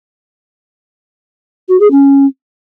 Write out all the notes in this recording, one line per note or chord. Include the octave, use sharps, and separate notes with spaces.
F#4
G#4
C#4